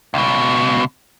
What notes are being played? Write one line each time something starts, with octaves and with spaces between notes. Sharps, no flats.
C#2 B2